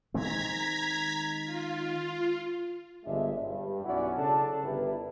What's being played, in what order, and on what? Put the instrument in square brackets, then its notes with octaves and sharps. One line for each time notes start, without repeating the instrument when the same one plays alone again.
[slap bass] D#3 G#3 C4 [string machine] A#5 G#6 B6
[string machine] F4
[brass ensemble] G1 B2 G#3 D4 E5
G2
B1 C#4 E4 F#4 D5 F#5
C#3 D4 A4 A5
G1 E4 G4 A#4 B4